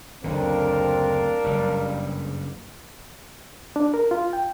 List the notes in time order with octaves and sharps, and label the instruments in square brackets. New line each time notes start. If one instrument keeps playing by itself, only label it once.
[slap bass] F#1 D2 D3 [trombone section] C4 [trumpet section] D4 A#4 F5
[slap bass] F#1 G2 [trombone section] G3
[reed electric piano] D4
A#4
F4
G5